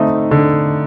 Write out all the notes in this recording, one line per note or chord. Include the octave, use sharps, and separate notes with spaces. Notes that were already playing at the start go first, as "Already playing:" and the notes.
Already playing: D3 A3 C4 D#4
D3